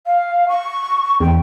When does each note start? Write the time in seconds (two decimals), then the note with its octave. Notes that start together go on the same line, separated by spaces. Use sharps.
0.06 F5
0.48 C#6
1.20 E2 G5